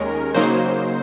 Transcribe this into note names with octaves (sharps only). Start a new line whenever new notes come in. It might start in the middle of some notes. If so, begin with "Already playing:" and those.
Already playing: D#2 D#3 G#3 C#4 A#4
C#3 F#3 A#3 D#4 C5